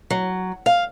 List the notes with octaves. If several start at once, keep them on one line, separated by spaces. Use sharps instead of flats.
F#3
F5